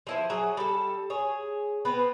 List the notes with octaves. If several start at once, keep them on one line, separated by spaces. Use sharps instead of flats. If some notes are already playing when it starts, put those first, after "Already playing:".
F3 E4 C5
F#3 F#4 G#4
G3 A4
G#4 C#5
B3 C4 B4